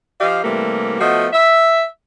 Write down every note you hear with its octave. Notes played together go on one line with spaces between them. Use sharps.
F3 G4 D#5 F5
C3 E3 G3 A3 A#3
F3 A3 B3 F#4 D#5
E5